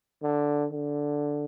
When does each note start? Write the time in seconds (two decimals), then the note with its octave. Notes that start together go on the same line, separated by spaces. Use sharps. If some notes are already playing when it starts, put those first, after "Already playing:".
0.23 D3
0.71 D3